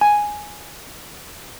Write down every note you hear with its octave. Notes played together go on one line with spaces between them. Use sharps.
G#5